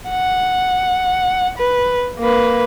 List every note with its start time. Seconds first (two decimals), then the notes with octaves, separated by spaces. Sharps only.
0.10 F#5
1.58 B4
2.19 A#3 B4